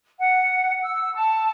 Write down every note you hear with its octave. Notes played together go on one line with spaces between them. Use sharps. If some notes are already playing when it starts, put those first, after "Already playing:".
F#5
E6
A5